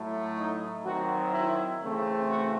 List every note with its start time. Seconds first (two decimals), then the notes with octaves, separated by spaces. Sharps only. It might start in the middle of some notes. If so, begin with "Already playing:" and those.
Already playing: A2 F#3 A3
0.37 D#4
0.85 D#3 F#3 C4 F#4
1.33 E4
1.81 C#3 E3 A3 C4
2.29 F#4